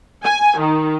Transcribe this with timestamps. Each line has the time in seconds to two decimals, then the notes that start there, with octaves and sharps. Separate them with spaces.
0.24 G#5
0.59 D#3